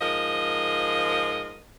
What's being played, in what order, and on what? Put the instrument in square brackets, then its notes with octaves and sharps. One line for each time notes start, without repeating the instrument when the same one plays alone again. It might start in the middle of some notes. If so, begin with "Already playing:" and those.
[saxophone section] G#2 F3 A#4 D#5